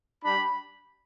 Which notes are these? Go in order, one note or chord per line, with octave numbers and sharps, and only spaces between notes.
G3 D4 G4 B5